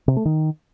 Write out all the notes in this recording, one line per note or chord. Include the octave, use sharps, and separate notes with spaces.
C3
A3
D#3